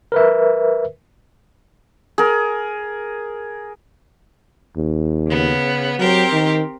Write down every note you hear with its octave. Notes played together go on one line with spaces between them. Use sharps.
A#4 B4 E5
G#4 A#4
D#2
C#3 B3
F#3 C4 G4 A#4
D#3